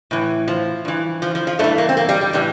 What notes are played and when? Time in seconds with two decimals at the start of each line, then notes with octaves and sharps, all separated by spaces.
0.11 A2 E3
0.48 F3
0.85 G2 E3
1.22 F3
1.35 F3
1.47 F3
1.59 G2 E3 A3
1.78 A#3
1.89 C4
1.97 A#3
2.09 G3
2.21 G3
2.33 A2 E3 G3